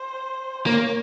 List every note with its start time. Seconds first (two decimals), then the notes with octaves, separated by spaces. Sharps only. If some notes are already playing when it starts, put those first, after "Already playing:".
Already playing: C5
0.66 A#3 C#5